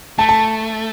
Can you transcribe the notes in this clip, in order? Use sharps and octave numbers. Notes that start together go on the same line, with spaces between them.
A3 A5
A5